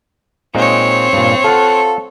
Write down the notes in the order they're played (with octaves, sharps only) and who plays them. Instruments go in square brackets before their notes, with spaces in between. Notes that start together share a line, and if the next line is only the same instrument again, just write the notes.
[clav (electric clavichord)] A#2 G#3 D#4 [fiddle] C4 C#5
[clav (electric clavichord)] G2 A#2
[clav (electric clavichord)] F4 F5 F#5 [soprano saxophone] A4